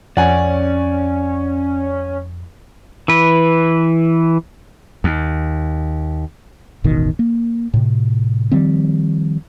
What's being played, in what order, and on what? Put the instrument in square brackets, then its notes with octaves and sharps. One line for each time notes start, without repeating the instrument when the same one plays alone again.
[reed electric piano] F2 [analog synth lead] C#4 [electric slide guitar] D5 [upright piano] F#5 G#5
[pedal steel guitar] E3 B4
[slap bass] D#2
[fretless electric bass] E1 A1 B2 D#3
A#3
A2 C3
D#3 F3 G3 C4